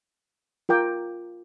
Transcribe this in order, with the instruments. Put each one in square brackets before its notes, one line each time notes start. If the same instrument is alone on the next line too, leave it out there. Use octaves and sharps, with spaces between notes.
[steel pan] F4 A#4 G5 D6